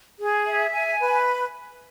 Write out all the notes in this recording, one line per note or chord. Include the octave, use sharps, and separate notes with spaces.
G#4
E5
G#5
B4